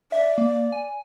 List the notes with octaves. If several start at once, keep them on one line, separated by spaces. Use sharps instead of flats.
D5 E5
A#3
G#5